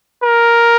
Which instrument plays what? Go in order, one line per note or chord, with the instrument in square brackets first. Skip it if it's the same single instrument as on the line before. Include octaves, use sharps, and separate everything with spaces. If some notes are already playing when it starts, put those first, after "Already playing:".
[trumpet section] A#4